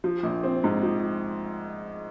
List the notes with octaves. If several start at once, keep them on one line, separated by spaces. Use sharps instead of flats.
F3
A#1
C4
G#2
F3